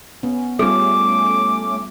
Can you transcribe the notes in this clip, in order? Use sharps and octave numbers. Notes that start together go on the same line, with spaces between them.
B3 C#4
G3 A3 B3 C#4 F4 G#4 D6